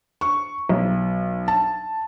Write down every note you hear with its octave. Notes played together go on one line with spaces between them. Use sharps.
C#6
B1
A5